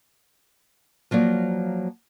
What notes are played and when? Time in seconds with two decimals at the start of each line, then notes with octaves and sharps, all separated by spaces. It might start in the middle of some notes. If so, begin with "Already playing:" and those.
1.11 F3 F#3 A#3 D5